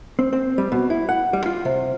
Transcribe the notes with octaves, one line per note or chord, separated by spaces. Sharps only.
C4
C4
G3
B2
E4
F#5
G3
F4
C3